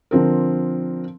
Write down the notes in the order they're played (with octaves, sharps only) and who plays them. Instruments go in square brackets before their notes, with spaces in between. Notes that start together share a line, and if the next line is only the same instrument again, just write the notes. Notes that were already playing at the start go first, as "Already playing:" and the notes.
[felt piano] D3 F3 C4 A#4